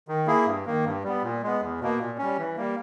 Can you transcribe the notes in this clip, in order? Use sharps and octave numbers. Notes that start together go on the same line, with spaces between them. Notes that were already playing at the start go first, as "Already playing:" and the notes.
D#3
A#3 E4 G#4
G2
D#3 A#3
G2
G3 B3
A#2
G#3 B3
E2
B2 A#3
A#2
G3 C#4
E3
G3 A#3